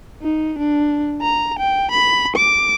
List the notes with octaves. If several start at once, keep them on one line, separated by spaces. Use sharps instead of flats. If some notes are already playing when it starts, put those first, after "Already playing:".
D#4
D4
A#5
G5
B5
D6